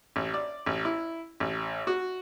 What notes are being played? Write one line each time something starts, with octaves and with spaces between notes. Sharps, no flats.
A1
D5
A1
E4
A1
F#4